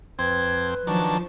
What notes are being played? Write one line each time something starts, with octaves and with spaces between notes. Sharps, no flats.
F2 C4 B4 C5 G#6
D#3 F3 F#3 D4 A5